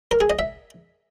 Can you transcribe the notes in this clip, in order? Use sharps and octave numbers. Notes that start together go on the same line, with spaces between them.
A#4
G#4
D#5
E5